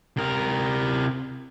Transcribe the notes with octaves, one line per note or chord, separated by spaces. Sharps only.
C3 A#4